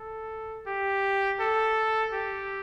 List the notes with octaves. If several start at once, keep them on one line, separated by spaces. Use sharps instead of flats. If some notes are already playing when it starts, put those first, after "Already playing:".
Already playing: A4
G4
A4
G4